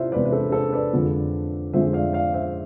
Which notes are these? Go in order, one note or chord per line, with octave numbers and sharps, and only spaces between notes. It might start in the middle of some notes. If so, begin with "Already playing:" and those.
Already playing: C3 D4 E4 F4 C5 E5
E2 C3 G#3 B4 D5
B4
A4 C5
A4 C5
B4 D5
F2 D3 F3 G#3
F2 D3 F3 G#3 C5 E5
D5 F5
D5 F5
C5 E5